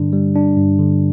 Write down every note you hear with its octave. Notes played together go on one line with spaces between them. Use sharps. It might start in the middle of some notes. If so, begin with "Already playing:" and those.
Already playing: G2 D3 G3 D4
G3
D4
G2
D3